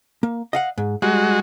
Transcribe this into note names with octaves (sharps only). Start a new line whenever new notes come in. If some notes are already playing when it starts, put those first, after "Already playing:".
A#3
D#5 F5 F#5
G#2
G3 G#3 F#4